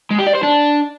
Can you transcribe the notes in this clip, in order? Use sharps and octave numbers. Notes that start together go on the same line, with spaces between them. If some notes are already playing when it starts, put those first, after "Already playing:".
G#3
G4
D5
C5
D4